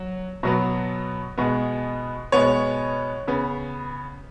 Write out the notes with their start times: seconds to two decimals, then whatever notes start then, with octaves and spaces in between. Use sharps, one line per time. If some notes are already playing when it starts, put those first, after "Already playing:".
Already playing: F#3
0.43 B2 F#3 B3
1.38 B2 G#3 B3
2.32 B2 G#3 B3 C#5
3.28 C#3 B3